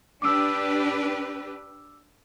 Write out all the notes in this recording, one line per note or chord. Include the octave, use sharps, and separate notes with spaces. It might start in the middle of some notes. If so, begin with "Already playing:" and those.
D4 G4 B4 D6 E6